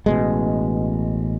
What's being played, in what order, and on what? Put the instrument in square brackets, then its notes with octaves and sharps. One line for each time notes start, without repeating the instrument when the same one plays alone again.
[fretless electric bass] A1 B2 G#3